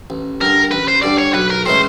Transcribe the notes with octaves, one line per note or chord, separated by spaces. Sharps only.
A1
G2 D3 A#4
A1 B4
C5
G2 D3 D5
C#5
B1 B4
A#4
A2 E3 G#3 C#4 C5